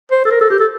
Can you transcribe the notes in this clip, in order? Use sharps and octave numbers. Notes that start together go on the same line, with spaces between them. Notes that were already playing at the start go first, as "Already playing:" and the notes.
C5
A4
A#4
A4
G4
A4